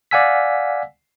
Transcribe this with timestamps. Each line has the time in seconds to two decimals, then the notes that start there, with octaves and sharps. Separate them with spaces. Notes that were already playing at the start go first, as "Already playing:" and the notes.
0.11 D5 F5 F#5 G#5 E6 B6